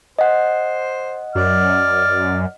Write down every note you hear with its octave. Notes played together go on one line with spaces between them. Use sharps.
C5 D#5 F#5
F#2 D5 F6